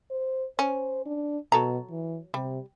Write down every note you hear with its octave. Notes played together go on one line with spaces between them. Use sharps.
C5
C#4 C5
D4
B2 F#3 A4 A#5
E3
C3 G3